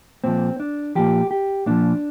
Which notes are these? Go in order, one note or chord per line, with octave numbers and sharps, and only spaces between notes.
A#2 F3 C4
D4
A#2 F3 G4
G4
A#2 F3 D4